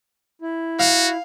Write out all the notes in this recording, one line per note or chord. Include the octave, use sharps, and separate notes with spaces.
E4
F#4 F5